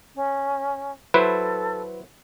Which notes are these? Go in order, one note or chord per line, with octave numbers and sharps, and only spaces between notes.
C#4
F#3 E4 A4 B4 C5